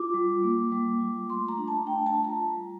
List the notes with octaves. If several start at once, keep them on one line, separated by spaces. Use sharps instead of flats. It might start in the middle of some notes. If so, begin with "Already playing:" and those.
Already playing: F4 D6
G3
A#3
G3
F4
A3 C6
A#5
D4
A5
A3 G5
A5
F4
A#5
G3